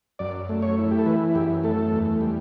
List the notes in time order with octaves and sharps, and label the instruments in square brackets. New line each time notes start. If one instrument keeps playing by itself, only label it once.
[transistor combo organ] F#2 D5
A3
C#5
E4
G4
A4
E3 B4
F#2 G4
A3 A4
E2
G3